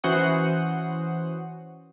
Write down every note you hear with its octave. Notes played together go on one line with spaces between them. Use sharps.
E3 C#4 F#4 C5 F#5 D#6